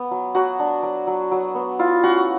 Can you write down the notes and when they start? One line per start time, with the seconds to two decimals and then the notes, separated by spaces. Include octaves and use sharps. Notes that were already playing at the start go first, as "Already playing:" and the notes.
Already playing: B3
0.11 F#3
0.35 F#3 F#4
0.59 D4
0.83 F#3
1.07 F#3
1.31 F#3
1.55 B3
1.79 E4 F4
2.03 C#4 F#4